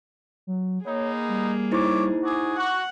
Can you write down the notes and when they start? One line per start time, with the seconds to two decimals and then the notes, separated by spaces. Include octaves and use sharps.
0.47 F#3
0.85 A#3 B3 D#4 G#4 C#5
1.28 G3
1.71 D#4 E4 C5 C#5 D6
2.23 F#4 G#4 D6
2.56 F#4 F#5